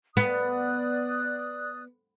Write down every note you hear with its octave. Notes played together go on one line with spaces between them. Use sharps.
B3 D5 D#6 F#6